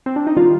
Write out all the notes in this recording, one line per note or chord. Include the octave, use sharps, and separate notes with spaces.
C4
D4
D#4
D#3 G3 F4